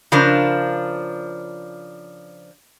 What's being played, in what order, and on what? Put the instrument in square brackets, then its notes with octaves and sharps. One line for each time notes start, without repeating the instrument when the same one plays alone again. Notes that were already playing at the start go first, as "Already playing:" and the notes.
[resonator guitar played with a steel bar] C#3 F3 D4 A#4